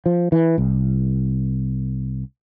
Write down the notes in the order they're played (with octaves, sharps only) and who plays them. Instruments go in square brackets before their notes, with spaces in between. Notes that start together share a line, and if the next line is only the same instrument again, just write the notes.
[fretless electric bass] F3
E3
C2